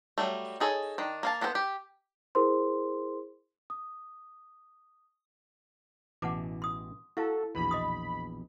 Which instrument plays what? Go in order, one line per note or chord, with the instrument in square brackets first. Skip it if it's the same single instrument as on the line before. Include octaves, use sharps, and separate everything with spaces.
[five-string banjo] F#3 G3 A3
D#4 G#4 A4 C#5
D#3 D4
A#3 F5 A5
A#3 B3 A4 A#4 C5
G4
[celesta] E4 G#4 A#4 C5 C6
D#6
[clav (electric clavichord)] A1 B2 E3 [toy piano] F#5 A5 D6
[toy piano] C6 D#6
[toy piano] E4 F5 A5 [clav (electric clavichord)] F#4 [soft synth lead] A4
[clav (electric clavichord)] A#1 E2 B2 [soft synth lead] B5
[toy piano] D#5 C6 D#6